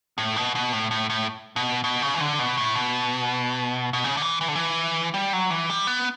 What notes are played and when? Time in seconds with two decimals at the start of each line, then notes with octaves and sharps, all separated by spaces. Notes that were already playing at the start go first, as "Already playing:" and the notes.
0.18 A2
0.36 B2
0.55 B2
0.73 A2
0.91 A2
1.10 A2
1.56 B2
1.84 B2
2.02 C#3
2.15 E3
2.21 D3
2.39 B2
2.57 A2
2.75 B2
3.93 B2
4.04 C#3
4.17 D3
4.22 E3
4.41 E3
4.48 D3
4.55 E3
5.14 G3
5.33 F#3
5.50 E3
5.70 G3
5.87 B3